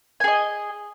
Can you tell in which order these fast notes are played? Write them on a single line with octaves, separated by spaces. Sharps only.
G#5 G#4 D#5